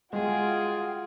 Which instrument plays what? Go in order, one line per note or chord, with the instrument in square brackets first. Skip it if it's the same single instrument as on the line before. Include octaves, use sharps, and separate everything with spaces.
[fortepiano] G#3 [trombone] F4 [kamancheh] F#4 G5 [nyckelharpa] G#4